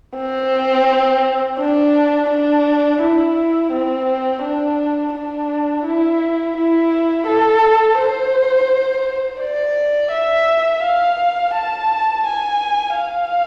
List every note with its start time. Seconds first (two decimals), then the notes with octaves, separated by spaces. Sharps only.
0.17 C4
1.59 D4
2.30 D4
3.02 E4
3.72 C4
4.43 D4
5.15 D4
5.85 E4
6.57 E4
7.27 A4
7.99 C5
9.41 D5
10.12 E5
10.84 F5
11.54 A5
12.26 G#5
12.96 F5